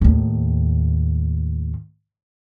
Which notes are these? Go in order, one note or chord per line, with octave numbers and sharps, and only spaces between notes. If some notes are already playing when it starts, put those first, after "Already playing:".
D#2 A2